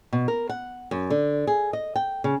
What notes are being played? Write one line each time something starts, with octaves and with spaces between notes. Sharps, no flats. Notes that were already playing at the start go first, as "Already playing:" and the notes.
B2
A#4
F#5
F#2
D3
G#4
D#5
G5
C#3